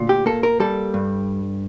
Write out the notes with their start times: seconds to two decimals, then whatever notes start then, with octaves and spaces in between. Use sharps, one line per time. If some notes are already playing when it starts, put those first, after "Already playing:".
Already playing: D2 A#2
0.09 G4
0.26 A#3 A4
0.43 A#4
0.60 G3 A4
0.94 G2